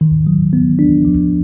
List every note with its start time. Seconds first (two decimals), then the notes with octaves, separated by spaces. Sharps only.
0.01 D#3
0.27 F#3
0.53 B3
0.79 D4
1.05 F3